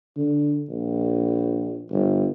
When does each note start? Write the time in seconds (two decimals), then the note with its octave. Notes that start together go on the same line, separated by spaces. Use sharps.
0.17 D3
0.70 A#1
1.90 G1